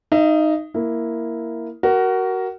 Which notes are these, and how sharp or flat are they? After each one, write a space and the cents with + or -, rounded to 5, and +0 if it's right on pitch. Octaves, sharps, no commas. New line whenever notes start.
D#4 +0 E5 +40
A#3 +0 E4 +0
F#4 +20 A#4 +0